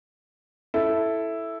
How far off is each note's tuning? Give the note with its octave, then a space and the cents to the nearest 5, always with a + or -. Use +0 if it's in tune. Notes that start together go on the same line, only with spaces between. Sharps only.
E4 +0 A4 +0